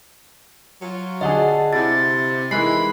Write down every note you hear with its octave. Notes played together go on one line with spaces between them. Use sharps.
F#3 F4
D3 D4 G#4 D#5 F#5 A5
C3 E4 A6
D#3 E3 G#3 E4 B5 F#6 C7